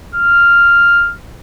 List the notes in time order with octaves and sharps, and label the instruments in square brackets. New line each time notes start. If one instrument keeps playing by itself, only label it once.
[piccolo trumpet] F6